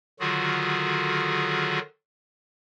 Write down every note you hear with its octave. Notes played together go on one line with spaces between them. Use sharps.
D3 D#3 F#3 F4 F#4 G#4